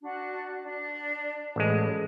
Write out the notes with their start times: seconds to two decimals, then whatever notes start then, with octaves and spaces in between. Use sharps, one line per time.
0.02 D4 F#4
0.62 D4 D5
1.56 A1 G#3 A5 B5